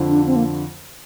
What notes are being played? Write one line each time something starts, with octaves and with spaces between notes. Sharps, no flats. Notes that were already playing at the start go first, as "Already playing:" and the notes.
Already playing: F2 D3 F3
D4
C4
A#3